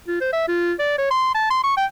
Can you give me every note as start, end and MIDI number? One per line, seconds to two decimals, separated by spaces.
0.08 0.18 65
0.21 0.33 72
0.33 0.46 76
0.48 0.73 65
0.79 0.98 74
0.98 1.06 73
1.11 1.31 84
1.34 1.50 81
1.50 1.59 84
1.63 1.75 85
1.77 1.85 79